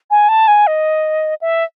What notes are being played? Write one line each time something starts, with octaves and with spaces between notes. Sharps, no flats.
G#5
A5
G#5
D#5
E5